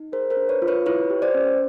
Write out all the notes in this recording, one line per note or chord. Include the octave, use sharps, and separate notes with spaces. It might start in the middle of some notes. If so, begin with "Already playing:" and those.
Already playing: D#4
G#4 A#4 C5
A#4 C5
D4
B4 C#5
F4
B4 C#5
E4 B4 C#5
G4
C5 D5
C#4